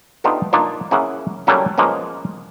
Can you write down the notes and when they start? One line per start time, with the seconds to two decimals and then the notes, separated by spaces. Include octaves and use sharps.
0.24 A3 B3 D4 D#4 F4 G4
0.53 A#3 D4 D#4 F4
0.91 A#3 C#4 E4 G#4 E5 F#5
1.47 F#3 G3 A3 A#3 C#4 E4
1.78 F3 G#3 A#3 B3 C#4